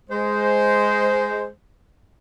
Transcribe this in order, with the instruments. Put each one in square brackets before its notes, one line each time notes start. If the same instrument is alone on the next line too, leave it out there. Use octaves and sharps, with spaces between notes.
[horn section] G#3 C5